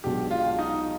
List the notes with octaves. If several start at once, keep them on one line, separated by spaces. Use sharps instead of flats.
B1 B2 G#3 D4 G4
F4
D#4